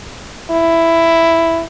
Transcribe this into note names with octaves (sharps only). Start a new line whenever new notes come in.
E4